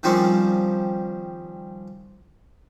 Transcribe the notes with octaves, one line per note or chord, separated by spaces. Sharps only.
D#3 F3 G3 C4 C#4